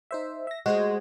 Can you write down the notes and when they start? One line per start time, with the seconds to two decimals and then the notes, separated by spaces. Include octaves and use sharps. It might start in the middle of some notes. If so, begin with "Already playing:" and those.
0.11 D#4 C5 E5
0.47 E5 A#6
0.66 G#3 F#4 G#4 C5